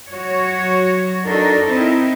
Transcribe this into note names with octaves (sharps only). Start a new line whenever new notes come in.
F#3 F#4 C#5
D4 D#4 F#4 A4 A#4
C4 D#4 E4 A#4